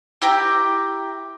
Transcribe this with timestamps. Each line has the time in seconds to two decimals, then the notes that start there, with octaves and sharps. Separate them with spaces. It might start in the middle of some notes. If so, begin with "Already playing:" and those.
0.22 E4 G4 G5 A#5